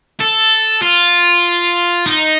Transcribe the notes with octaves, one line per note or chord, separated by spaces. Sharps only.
A4
F4
D#4